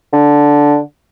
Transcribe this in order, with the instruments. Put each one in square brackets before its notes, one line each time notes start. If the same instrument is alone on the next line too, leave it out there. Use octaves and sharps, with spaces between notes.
[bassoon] D3